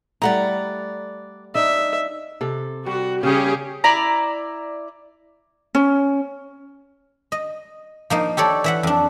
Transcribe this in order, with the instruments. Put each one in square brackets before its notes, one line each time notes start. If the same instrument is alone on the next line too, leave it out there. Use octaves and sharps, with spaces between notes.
[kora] G3 A3 E4 [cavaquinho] D5 F#5 A#5
[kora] D4 D#4 [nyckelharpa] E5
[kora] C3 A4
[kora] G3 [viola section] F#4
[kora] C#3 G3 [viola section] C#4 G4 G#4
[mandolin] E4 D5 A#5
[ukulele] C#4
[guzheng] D#5
F3 A#3 D#4
G4 A4 C#5 D5
E3 E5 F#5
F2 D4